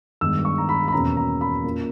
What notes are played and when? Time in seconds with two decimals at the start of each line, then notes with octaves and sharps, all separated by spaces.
0.21 G2 D#3 G#3 B3 E6
0.45 C#6
0.58 A#5
0.69 B5
0.88 B5
0.92 E2 B2 A#3 C#4 A#5
1.17 A#5
1.41 B5
1.64 A#2 A#3 C#4